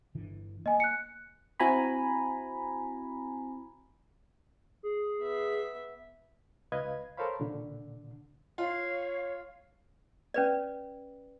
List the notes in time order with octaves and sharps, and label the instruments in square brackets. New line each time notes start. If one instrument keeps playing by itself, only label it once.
[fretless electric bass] G1 D3 E3
[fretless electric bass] A#3 [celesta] D#5 G#5
[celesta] F#6 C#7
[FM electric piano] C4 E4 F#4 G#5 A#5 B5
[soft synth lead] G#4
[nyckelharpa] B3 E5
[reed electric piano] C#2 B4 D#5 F5 G#6
A4 A#4 C5 C#5 F5 B5
A#2 D3
[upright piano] F4 [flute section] C#5 F5
[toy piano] C#4 B4 D5